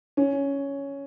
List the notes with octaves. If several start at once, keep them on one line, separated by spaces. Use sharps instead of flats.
C#4